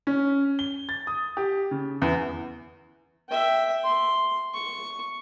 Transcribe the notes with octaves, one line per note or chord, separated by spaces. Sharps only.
C#4
G7
A6
D#6
G4
C#3
E2
E5 G5
C6
C#6